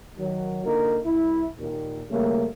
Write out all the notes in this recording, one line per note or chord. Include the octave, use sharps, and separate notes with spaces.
D#3 F#3
D3 A#3 D#4 F4 A#4
C2 E4
D#2 A#2
C#3 G3 A3 A#3